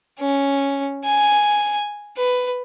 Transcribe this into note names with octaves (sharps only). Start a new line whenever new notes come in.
C#4
G#5
B4